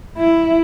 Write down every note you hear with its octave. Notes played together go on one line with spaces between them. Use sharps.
E4